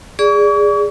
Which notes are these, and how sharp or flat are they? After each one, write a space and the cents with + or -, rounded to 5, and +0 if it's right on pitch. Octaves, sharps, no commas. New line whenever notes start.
G#4 -15 D5 -10 C#6 +40